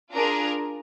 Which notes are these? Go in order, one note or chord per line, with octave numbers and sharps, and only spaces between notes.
D4 F4 G#4 A#4 A#5